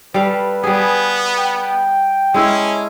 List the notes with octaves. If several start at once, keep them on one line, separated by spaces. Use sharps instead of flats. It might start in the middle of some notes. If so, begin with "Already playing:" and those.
G3 A4 B4 F5
G3 B3 G#4
G5
G#3 C#4 E4 A4